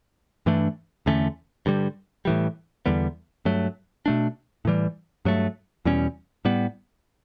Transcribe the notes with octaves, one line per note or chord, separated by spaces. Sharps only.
G2 E3 A3 D4
E2 D3 A3 C#4
G2 D3 G3
A2 E3 G3
E2 D3 G3 B3
G2 F#3 A3
B2 A3 D4
A2 E3 G3
G2 F#3 A3
E2 B2 G3 C#4
A2 G3 B3